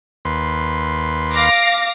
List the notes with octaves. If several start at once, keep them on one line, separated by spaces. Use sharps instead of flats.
D#2 B4 C6
F5 D6 A#6